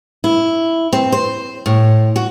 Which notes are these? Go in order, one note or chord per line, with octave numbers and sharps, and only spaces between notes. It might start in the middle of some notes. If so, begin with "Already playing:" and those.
E4
C4
C5
A2
F#4